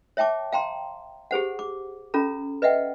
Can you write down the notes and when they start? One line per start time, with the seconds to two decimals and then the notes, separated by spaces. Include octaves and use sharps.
0.17 C#5 E5 G5 A5 D6
0.53 F5 G5 A#5 C6
1.31 G4 G#4 C5 F#5
1.59 D6
2.14 C#4 F4 A4 A#5
2.62 B4 D#5 E5 F#5 G5